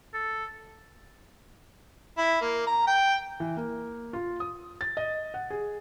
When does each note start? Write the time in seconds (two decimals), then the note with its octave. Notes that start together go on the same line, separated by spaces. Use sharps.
0.14 A4
2.18 E4
2.41 A#3
2.67 A#5
2.87 G5
3.40 E3
3.57 A#3
4.13 F4
4.40 D#6
4.81 A6
4.97 D#5
5.34 F#5
5.50 G#4